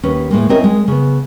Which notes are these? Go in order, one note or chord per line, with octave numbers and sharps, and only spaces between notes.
D#2 C#4 B4
A2 G#3 A#3
C4 C#4 E4 A#4 C#5 D#5
G#3
C#3 B3